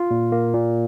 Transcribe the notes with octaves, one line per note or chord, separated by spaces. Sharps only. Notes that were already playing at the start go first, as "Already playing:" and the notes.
Already playing: F4
A#2
A#3
A#2